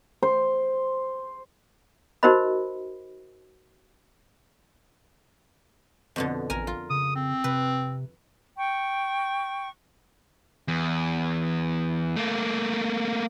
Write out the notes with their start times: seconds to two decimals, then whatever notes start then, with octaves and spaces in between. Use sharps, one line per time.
0.23 C5
2.23 D#4 F#4 A#4 C5 D#5 B5
6.16 F2 B2 D3
6.50 A1 A#4 G#5
6.67 F4
6.90 C#3 D#6
7.16 C4
7.44 C3 B4
8.57 G5 C#6
10.68 E2
12.16 A3 A#3